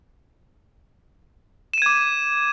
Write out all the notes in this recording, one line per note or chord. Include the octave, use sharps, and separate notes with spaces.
D6 G#6 D#7 E7